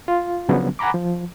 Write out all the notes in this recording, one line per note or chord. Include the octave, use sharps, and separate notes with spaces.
F4
C#3 F3 F#3 B3 D4
F#5 G#5 A#5 B5 D6
F3